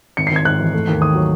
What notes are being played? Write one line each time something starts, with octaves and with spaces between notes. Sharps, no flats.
G#1 C#7
C7
G#1
G#6
G#2 F#6
E3
A3
D#2
D#3 D#6
F#3